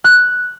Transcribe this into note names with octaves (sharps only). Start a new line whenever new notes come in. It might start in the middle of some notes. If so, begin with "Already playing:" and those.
F#6